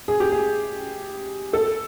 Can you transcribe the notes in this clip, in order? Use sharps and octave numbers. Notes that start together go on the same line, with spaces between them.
G#4
G4
G#4
A4